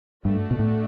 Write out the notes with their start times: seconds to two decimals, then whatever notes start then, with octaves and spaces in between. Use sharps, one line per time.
0.25 G2 A3 D4 F#4
0.51 B2
0.59 A2